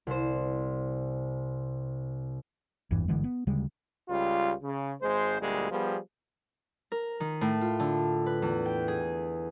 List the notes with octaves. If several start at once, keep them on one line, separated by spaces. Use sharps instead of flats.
C2 C5
G#1 E2 G2 E3
G1 D3 E3 G#3
B3
D2 C#3 G3 G#3
C#2 G3 F4
C#3
G#1 G#3 C5
D2 A#2 G3 G#3
F3 G3 B3 G#4
A#4
D#3
A2
F4
D3
B4
E2
G5
G#4